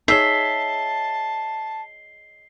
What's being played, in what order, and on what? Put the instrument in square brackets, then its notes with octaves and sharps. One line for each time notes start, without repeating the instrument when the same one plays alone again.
[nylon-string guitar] D#4 G#4 C#5 [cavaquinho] E5 [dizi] A5 [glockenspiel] C7 G7